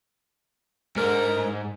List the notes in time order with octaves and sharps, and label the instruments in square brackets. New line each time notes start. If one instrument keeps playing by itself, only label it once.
[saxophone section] D2 A#4 [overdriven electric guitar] G#2